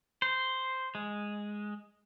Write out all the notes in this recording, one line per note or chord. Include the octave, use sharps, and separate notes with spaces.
C5
G#3